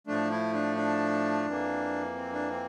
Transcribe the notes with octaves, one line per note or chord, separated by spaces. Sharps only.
A2 F3 A3 D4
E4
D4
D4
F2 E3 A#3
C4
D4
C4